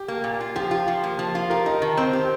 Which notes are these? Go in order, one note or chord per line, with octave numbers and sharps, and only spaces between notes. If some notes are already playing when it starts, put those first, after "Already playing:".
Already playing: G4
A#3
A#2
F4
F3 G4
F4
F3
A#3
F3
F4
G4 A#4
D#4
D#3
C4 C5
G4